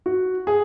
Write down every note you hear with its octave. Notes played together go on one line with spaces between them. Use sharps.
F#4
G#4